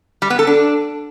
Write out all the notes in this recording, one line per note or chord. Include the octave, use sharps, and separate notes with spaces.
G3
B3
A4
D4